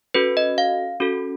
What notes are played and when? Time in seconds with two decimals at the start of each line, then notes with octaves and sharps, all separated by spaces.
0.14 C#4 F#4 A4 B4
0.37 D#5
0.58 F5
1.00 C#4 F#4 A4